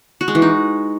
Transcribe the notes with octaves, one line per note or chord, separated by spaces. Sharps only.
F#4
G#3
E3
D#4